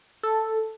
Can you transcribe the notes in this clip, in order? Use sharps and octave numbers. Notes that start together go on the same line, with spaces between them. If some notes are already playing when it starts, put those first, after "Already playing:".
A4